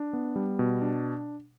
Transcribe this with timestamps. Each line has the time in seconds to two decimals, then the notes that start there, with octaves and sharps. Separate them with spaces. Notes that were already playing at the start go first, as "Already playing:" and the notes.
Already playing: D4
0.13 B3
0.36 G3
0.59 B2
0.82 D4